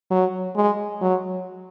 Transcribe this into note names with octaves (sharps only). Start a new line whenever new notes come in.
F#3
G#3
F#3